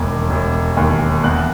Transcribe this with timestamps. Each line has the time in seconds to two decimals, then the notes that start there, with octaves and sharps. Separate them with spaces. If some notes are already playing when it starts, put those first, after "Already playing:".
Already playing: E1 D#2
0.30 E1
0.77 D#2
1.24 E2 F#6